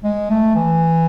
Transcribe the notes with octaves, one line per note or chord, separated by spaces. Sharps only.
G#3
A3
E3